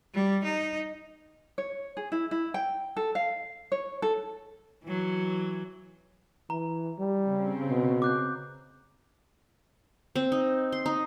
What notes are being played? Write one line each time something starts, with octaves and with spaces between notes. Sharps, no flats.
G3
D#4
C#5
G#4
E4
E4
G5
A4
F5
C#5
A4
E3 F#3
E3 A#5
G3
C#3 C4
B2
D6 F#6 G6
C4
D#4
C6
D#4